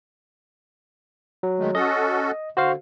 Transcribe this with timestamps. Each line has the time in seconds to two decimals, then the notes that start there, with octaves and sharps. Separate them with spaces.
1.43 F#3
1.59 D#3 G#3 A3
1.75 C#4 F#4 A4 D#5
2.57 D3 F#4 C5 F5